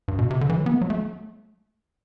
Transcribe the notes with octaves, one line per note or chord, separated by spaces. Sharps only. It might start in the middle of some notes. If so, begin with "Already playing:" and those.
G2
B2
C3
D3
E3
F#3
B3
A3
F#3
A3